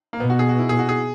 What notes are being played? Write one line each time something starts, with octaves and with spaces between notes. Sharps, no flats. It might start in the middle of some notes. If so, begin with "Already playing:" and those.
A#3
B2 B3
F#4
G#4
F#4
E4
G#4
F#4
G#4